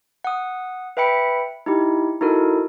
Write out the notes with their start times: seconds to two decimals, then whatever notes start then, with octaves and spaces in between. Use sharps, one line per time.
0.24 F#5 D#6
0.97 B4 E5 G5 B5 C#7
1.66 D#4 E4 G4
2.21 D#4 E4 F#4 A4 A#4